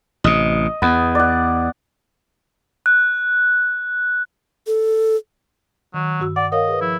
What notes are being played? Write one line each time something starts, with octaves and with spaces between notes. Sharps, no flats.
A1 C3 D#5
E2 B3
D5 F#5
F#6
A4
D#3 F#3
G2 F#4 E6
D5 F#5
A#4 C#5 D#5 F5
G#4 B4
F3 E4